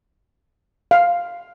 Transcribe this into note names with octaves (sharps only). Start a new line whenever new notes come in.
F5